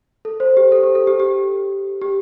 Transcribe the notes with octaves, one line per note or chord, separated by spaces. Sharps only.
A4
C5
G4
A4
G4
A4
G4
G4
G4